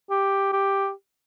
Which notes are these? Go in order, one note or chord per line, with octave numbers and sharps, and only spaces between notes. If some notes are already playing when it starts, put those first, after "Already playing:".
G4
G4